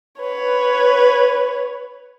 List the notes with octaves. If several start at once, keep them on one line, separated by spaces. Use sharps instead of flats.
B4 C#5